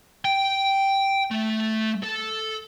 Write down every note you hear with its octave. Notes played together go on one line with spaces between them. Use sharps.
G5
A3
A4